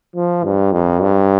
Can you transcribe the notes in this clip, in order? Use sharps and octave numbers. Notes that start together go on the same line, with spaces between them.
F3
G2
F2
G2